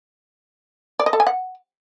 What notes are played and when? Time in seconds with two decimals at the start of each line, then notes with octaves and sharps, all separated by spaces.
1.00 D5
1.06 D#5
1.13 A4
1.20 G#5
1.27 F#5